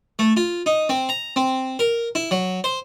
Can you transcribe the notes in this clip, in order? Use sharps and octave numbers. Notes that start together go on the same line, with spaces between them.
A3
F4
D#4
C4
A#5
C4
A#4
E4
F#3
C5